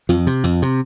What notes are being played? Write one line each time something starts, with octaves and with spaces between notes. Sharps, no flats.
F2 F3
C3
F2
C3